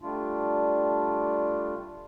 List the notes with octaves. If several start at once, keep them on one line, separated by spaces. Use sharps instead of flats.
G3 A3 D4 F4